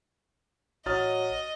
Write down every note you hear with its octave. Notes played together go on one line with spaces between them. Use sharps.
A1 F#3 D#5 D#6 F6 A6